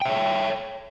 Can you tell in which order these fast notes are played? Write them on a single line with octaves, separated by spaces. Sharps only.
G5 E5 C#5